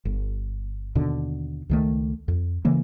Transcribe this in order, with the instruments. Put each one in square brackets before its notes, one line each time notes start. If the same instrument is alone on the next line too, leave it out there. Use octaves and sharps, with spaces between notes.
[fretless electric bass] G1
D#2 B2 D3
C#2 D#3 A3
F2
C#3 E3 A#3